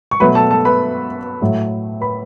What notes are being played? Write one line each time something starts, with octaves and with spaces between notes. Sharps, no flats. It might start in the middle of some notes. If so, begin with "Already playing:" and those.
C#6
B2 F#3 A3 B4 B5
A4 A5
A4 A5
B4 B5
A2 F#3 A3
B4 B5